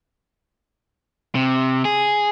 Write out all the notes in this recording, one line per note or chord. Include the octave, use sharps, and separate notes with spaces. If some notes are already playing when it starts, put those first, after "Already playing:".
C3
G#4